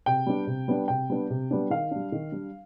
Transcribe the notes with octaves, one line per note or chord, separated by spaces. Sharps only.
C3 G5
G3 B3 D4
C3
G3 B3 D4
C3 G5
G3 B3 D4
C3
G3 B3 D4
D#3 F5
G3 D4
D#3
G3 D4